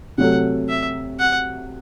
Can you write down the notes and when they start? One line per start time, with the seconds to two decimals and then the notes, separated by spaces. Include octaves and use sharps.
0.18 C3 F#3 A3 F#5
0.69 E5
1.19 F#5